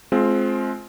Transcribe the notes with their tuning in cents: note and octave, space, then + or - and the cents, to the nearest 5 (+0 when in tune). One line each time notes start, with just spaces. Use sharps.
G#3 +35 C4 +5 F4 +0